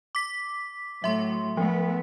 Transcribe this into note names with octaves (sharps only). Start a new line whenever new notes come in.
D6 B6
A2 F#3 E5 C6
F3 A3 B3